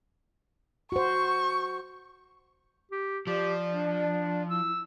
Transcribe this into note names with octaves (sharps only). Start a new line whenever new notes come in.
F#4 C5 C#6
G4
F3 G4 D5
D4
E4 E6